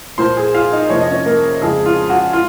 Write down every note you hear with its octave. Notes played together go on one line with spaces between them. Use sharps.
A#2 F3 A#3 C5 C6
G#4 G#5
F4 F5
D#4 D#5
F2 C3 F3 A#3 C#5
D#5
C#4 C#5
A#3 A#4
F2 C#3 F3 G#3 G#4
F4
F#4
F4